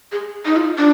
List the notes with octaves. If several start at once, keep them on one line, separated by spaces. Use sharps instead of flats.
G#4
D#4
F4
D4